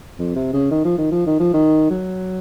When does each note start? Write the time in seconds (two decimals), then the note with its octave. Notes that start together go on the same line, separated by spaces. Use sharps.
0.19 F2
0.36 C3
0.53 C#3
0.71 D#3
0.85 F3
0.98 D#3
1.12 F3
1.26 D#3
1.40 F3
1.53 D#3
1.90 F#3